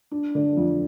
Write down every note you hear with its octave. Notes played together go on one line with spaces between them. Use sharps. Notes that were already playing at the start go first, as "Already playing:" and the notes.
D4
D3
F2